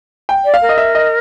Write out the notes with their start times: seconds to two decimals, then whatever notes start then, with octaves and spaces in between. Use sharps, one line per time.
0.29 G5
0.45 D5
0.54 F5
0.62 A#4
0.69 D#5
0.78 E5
0.95 D#5